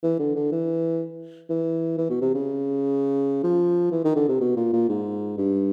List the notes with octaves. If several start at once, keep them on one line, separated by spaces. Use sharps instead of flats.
E3
D3
D3
E3
E3
E3
B2
C3
C#3
F3
E3
D#3
D3
C3
B2
A#2
A#2
G#2
G2